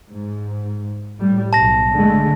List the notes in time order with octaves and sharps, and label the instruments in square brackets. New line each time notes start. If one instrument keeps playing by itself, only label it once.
[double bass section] G#2
A2 G3
[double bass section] B1 [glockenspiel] A5 A#6
[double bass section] D3 G#3 A3